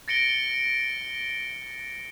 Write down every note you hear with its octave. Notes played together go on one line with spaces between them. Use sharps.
A6 A#6 C#7 D7 G7